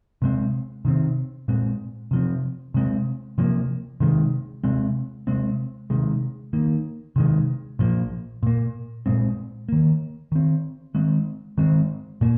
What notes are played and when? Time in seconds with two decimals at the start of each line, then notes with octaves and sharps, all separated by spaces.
0.22 C3 G#3 C4
0.85 C3 D#3 C4
1.48 A#2 G#3 C4
2.11 C3 F3 C4
2.74 C3 G#3 C4
3.38 C3 F3 A#3
4.00 C3 D#3 G#3
4.64 C3 G#3 C4
5.27 C3 G#3 C4
5.90 C3 D#3 G#3
6.53 D#3 A#3
7.16 C3 D#3 G#3
7.79 A#2 F3 A#3
8.43 A#2 A#3
9.06 A#2 G#3 C4
9.69 D#3 A#3
10.32 D#3 C4
10.95 D#3 G#3 C4
11.58 D#3 G#3 C4
12.21 A#2 A#3